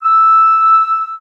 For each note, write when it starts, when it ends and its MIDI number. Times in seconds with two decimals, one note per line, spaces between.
0.04 1.14 88